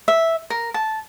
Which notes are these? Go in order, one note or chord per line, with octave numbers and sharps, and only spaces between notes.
E5
A#4
A5